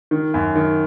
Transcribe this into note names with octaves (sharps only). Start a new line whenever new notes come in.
D#3
F#2
D#3